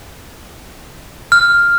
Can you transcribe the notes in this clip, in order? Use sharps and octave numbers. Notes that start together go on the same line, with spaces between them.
F6